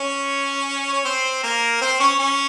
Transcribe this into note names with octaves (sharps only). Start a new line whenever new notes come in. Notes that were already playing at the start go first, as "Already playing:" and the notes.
Already playing: C#4 C#5
C#5
C4 C5
A#3 A#4
C4 C5
C#4 C#5
C#4 C#5